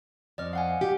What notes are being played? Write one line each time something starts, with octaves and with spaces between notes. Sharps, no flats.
F2 D5 D#5 F6
F5 F#5 G#5
G4